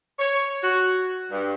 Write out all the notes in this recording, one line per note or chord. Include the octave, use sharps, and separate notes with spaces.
C#5
F#4
G2